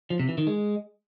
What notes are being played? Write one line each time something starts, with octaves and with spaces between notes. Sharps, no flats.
F3
C3
E3
D#3
G#3